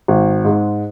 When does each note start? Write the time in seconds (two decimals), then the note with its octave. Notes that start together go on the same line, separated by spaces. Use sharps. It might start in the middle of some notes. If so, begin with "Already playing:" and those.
0.08 G#1
0.45 G#2 G#3